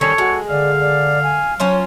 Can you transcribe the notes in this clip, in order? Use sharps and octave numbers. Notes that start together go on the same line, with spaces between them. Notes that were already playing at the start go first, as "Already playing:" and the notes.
D#3 G3 C#4 A4 C#5
G#3 F#4
D3 D5 F5
D5
G#5
F#3 C#4 F4 C5 C#5